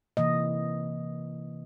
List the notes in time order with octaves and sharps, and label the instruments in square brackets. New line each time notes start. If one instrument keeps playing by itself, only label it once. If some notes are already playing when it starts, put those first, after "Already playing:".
[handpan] C3 E3 A#3 D#5